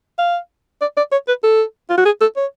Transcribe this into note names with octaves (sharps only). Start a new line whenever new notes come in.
F5
D5
D5
C#5
B4
A4
F4
F#4
G#4
A4
C#5